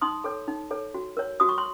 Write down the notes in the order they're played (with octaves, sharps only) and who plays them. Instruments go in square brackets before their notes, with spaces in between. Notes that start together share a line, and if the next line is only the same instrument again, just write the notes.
[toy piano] D#4 C6 D#6
A4 C#5
D#4
A4 C#5
F#4
A#4 C#5
F#4 D#6
C#6
C6